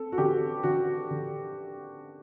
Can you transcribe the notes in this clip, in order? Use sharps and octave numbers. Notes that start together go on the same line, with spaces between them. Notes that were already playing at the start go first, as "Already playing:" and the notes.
Already playing: C4 A4
F#4
D3 G4
D3 F#4
D3